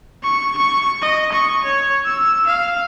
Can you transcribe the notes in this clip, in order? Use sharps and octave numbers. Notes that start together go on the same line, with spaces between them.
C#6
C#6
D#5
C#6
C#5
E6
F5